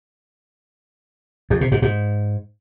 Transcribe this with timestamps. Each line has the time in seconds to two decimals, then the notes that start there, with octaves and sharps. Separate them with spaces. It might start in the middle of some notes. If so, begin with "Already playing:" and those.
1.50 F2
1.61 C3
1.72 G#2
1.82 G#2